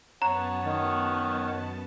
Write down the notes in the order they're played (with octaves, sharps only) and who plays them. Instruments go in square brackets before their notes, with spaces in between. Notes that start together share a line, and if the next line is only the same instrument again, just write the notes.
[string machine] F#2 B3 A5 [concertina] C#5 F#5 [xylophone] A#5
[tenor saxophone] D#3